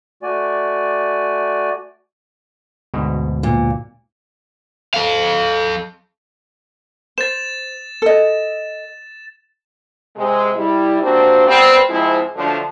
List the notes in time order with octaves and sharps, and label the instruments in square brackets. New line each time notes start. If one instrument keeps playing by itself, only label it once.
[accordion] A3 F#4 D5 G#5
[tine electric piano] D2 G#2 B2
[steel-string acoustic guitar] A#2
[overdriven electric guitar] A4 F5
[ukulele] C5 [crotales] A6 E7
[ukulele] A4 D#5
[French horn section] C3 G#3
G3 E4
A#3 C4 D4 F#4 G4 C5
G3 B3 C4
G#2 F3 G#3 C4 E4
D3 F3 F#3 A3 D4